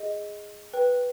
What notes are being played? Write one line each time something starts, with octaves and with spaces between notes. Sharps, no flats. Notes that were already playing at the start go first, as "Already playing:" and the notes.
Already playing: G#4 D#5
B4 G5